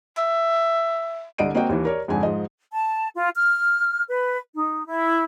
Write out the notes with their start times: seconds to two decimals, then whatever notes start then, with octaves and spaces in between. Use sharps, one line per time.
0.18 E5
1.38 C2 D3 D#5 D7 D#7
1.55 A#3 C4 F#4 D#5 F#5 G5
1.69 D#2 E3
1.85 A#4 C#5 D5
2.08 F2 G#2 D3 G#5
2.23 G#2 F3 D#5
2.72 A5
3.15 F4
3.35 F6
4.08 B4
4.56 D#4
4.87 E4